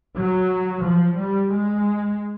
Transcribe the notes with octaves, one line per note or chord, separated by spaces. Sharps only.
F#3
F3
G3
G#3